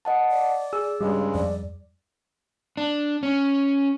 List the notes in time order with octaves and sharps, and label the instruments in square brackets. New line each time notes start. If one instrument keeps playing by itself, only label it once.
[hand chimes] D#5 F#5 A5
[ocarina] D5
[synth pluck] G#4 [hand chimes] E6
[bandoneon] G2 C#3 G#3 [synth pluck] G3
[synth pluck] F2 [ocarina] D5
[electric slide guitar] D4
C#4